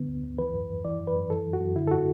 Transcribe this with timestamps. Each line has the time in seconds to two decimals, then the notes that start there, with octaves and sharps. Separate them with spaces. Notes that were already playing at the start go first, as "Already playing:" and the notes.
Already playing: D3 B3
0.08 D2
0.23 D2
0.38 E3 B4
0.54 F#2
0.70 F#2
0.85 E3 D5
1.00 F#2
1.07 B4
1.15 F#2
1.30 E3 A4
1.46 F#2
1.53 F#4
1.61 F#2
1.76 D3 E4
1.87 A4
1.91 F#4